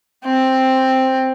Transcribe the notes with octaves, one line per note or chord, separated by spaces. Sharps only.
C4